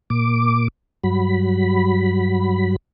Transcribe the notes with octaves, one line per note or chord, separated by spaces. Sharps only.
A#2 D6
G2 F#3 B5